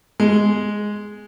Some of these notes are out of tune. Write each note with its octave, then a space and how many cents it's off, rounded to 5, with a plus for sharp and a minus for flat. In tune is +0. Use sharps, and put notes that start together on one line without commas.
G#3 +0